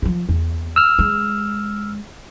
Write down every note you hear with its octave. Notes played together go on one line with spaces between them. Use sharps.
F3 F4
E2
E6 F6
G#3